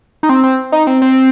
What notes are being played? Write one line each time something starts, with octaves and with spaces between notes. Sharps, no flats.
D#4
C4
C4
D#4
C4
C4